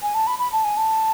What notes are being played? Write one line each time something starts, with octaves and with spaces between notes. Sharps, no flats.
G#5
A5
B5
B5
A5
G#5
A5